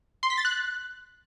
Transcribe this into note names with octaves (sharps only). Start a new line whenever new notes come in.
C6
B6
A6
F#6